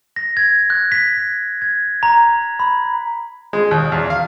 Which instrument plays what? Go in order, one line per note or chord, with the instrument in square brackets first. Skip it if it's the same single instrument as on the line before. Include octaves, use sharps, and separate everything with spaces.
[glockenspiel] A#6
G#6
F#6
B6
G#6
A#5
B5
[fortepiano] G#3
D#2
E2
F5